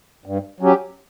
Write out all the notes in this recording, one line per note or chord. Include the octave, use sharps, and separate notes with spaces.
G2
F#3 C#4 G4